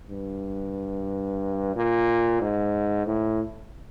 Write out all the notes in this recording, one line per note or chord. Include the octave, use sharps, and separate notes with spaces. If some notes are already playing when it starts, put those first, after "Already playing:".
G2
A#2
G#2
A2